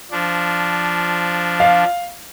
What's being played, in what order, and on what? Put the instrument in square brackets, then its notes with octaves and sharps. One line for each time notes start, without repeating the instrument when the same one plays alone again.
[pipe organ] F3 D4
[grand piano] F5